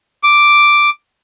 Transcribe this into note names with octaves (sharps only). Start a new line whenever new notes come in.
D6